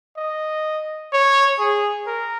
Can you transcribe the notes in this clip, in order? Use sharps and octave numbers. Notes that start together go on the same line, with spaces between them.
D#5
C#5
G#4
A#4